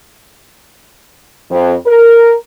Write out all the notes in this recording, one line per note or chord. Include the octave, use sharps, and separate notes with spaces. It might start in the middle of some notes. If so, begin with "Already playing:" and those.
F2
A#4